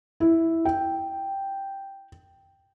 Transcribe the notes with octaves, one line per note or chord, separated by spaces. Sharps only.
E4
G5